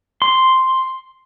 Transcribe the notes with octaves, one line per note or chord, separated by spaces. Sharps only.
C6